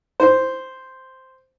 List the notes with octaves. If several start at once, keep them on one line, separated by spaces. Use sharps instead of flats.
C5